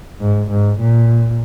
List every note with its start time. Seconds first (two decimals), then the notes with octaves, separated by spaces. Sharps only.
0.20 G#2
0.50 G#2
0.79 A#2